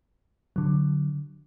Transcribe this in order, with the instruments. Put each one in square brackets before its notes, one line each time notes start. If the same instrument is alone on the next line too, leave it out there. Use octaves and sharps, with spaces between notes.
[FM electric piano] D3 F#3